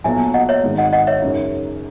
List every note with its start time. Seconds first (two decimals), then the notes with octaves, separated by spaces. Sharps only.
0.04 B1 A#2 F#3 E5 G#5
0.34 D#5 F#5
0.49 C#5 E5
0.63 G#1 G#2 D#3 G#3
0.78 D#5 F#5
0.93 D#5 F#5
1.07 C#5 E5
1.22 F#2 C#3 G#3 D#4